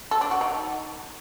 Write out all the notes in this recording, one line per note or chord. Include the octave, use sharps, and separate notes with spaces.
A4
D4
F#4
D#4